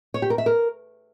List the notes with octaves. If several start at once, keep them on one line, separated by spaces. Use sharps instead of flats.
C#5
G4
A#4
E5
A#4